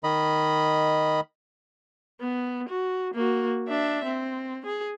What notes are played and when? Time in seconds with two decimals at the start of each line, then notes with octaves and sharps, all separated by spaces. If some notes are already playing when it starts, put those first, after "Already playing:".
0.04 D#3 D#5 B5
2.21 B3
2.69 F#4
3.14 A#3 F#4
3.68 D4 E5
4.05 C4
4.66 G#4